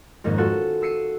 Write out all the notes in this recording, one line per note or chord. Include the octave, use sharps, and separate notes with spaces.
F2 G#2 D#3 A#3 C#4
F4 F#4 A4 F#5
E6 C7 C#7 D#7